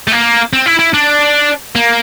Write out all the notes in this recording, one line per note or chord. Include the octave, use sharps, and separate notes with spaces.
A3
A#3
C4
E4
E4
D4
A#3